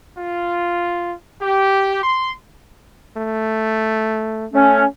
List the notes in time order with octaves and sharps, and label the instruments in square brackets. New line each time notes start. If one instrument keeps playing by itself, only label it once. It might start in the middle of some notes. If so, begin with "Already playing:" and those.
[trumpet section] F4
G4
C6
[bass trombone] A3
[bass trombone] A3 [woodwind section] C#4